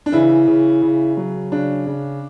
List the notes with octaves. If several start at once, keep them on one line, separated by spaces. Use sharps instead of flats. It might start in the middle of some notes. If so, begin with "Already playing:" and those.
D4
C#3 E3 E4
C#3
C#3
F#3
C#3 D4
C#3